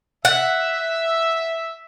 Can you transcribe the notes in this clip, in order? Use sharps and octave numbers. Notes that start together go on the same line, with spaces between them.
E5 F#5